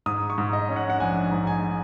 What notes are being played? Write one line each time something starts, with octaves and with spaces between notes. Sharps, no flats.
G#2 D#6
C#6
G#2
D#5
C#4
F#5
F#5
A#1 G#5
G#2
G#5